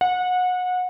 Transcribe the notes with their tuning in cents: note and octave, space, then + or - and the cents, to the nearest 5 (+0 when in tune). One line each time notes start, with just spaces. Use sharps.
F#5 -25